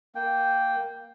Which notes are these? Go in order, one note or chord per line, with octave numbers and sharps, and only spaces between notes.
A#3 G5